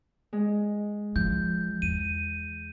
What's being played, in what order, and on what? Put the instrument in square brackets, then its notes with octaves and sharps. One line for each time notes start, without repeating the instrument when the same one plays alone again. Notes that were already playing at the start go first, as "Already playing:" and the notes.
[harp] G#3
[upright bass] F3 [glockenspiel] G6
[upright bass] E2 [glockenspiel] D#7